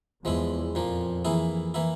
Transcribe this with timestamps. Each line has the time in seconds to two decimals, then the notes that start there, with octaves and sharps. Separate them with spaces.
0.25 E2 F3 G#3 E4
0.74 F2 A#2 F3 A#3
1.25 E3 A#3 E4 G#4
1.74 E3 A#3 E4